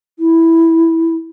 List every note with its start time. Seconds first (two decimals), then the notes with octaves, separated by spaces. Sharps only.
0.19 E4